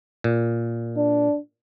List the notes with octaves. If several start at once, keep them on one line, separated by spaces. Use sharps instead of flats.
A#2
D4